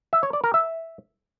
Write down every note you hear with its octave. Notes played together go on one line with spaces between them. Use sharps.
E5
C#5
D5
A#4
E5